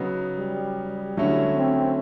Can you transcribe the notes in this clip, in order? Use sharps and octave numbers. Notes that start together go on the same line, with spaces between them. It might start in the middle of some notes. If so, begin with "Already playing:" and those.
Already playing: C#3 F#3 B3 D#4
G3
D3 F#3 A3 C#4 E4
C4